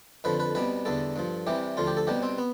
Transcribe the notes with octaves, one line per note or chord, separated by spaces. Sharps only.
F2 D3 F3 B4
B4
C2 B2 G3 B4
E2 D3 G3 A4
G2 F3
C2 C3 E3 G3 G4
D2 D3 F3 F4
G4
A4
C2 B2 G3 G4
C4
B3